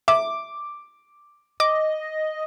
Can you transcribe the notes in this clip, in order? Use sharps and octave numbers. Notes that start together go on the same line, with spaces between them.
E5 D6
D#5 D6